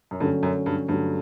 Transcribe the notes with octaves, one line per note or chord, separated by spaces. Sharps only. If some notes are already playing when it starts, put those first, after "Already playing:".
F#2
G2 D3 F#3 A3 C#4
F#2
G2
G2 D3 F#3 A3 C#4